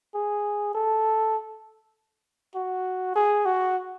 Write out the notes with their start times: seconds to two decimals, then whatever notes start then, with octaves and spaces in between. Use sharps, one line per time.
0.15 G#4
0.75 A4
2.55 F#4
3.16 G#4
3.45 F#4